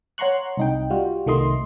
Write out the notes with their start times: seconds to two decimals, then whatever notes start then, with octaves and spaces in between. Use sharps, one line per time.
0.18 C#5 F#5 A#5 C6 C#6 F#6
0.57 C2 D#4 G5
0.90 G3 F4 F#4
1.26 C2 D#3 A3 D#5 C6